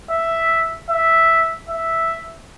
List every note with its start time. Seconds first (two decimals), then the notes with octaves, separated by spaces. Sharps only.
0.10 E5
0.90 E5
1.70 E5